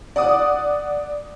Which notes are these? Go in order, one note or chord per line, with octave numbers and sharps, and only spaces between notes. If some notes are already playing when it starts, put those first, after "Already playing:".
D5 F#5 D6 D#6